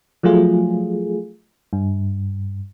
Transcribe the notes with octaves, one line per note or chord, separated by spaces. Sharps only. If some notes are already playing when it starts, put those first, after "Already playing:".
F3 F#3 A3 F4 G#4
G2